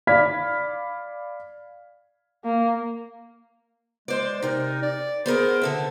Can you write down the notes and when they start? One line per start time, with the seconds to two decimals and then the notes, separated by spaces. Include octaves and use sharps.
0.07 D5 F5 B5 F6 G#6 B6
2.44 A#3
4.08 G#3 C5 D5
4.42 C3 D#4 A#4
4.83 D5
5.26 B3 G#4 A#4 C5
5.62 D3 A4 E5